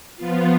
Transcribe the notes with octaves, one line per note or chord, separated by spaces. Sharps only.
F3 B3 F4